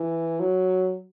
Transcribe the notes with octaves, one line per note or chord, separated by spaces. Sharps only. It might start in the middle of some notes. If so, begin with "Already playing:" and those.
Already playing: E3
F#3